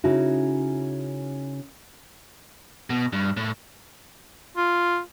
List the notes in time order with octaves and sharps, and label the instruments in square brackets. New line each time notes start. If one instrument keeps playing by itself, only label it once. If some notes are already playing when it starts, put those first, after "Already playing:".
[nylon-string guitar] C#3 C#4 D#4 E4 F#4
[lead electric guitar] B2
G2
A2
[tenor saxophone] F4